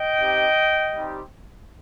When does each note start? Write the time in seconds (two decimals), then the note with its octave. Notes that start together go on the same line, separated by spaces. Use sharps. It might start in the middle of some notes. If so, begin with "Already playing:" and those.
Already playing: D#5 G5
0.20 C4 D#4 G4
0.95 G3 C4 D#4 G4